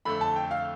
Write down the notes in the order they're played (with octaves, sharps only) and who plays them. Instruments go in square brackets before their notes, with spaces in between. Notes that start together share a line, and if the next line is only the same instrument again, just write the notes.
[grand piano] F2 D3 A3 [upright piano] B5
[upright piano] A5
G5
F5